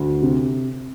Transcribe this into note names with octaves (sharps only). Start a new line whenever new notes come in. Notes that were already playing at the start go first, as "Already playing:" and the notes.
Already playing: D2
C3